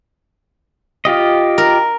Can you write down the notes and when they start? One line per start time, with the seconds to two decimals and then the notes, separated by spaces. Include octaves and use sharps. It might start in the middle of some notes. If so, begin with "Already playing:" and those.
1.05 F4 G4 D#5
1.58 A#4